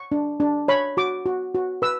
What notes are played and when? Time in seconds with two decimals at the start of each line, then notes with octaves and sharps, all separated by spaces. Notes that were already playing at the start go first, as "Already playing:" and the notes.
Already playing: C#6
0.12 D4
0.40 D4
0.68 C#5 B5
0.97 F#4 D6
1.26 F#4
1.55 F#4
1.82 B4 E6